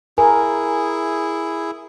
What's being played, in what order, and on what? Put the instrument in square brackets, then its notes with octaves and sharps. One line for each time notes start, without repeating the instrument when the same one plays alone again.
[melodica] E4 G#4 [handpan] A#4 [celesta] G#5